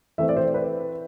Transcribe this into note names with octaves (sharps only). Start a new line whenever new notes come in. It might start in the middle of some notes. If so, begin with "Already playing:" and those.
E3 A3 C4 E5
D5
C5
B4